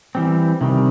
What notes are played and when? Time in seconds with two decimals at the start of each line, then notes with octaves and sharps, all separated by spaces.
0.15 E3 G3 C4
0.61 C3 D#3 G3